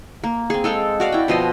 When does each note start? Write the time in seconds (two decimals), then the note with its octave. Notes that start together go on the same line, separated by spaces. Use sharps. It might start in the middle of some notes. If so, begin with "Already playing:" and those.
0.24 A#3
0.50 C4 G#4
0.64 G#3 A4 F5 G5
1.00 F#4 D5 F5
1.12 E4 G5
1.28 B2 F3 D#5 C6